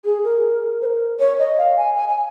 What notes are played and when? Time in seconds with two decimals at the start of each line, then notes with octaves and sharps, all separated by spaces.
0.05 G#4
0.24 A#4
0.82 C5
0.86 A#4
1.20 C#5
1.39 D#5
1.58 F5
1.77 G#5
1.96 G#5
2.09 G#5